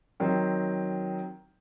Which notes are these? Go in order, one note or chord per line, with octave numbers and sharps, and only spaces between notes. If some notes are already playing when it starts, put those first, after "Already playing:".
D#3 F#3 C4